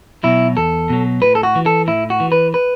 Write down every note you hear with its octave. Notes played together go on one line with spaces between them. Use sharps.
B2 F#3 E4
E2 A4
B2 F#3
A2 B4
A4
F#4
E3
A4
A2 E4
F#4
E3
B4
B4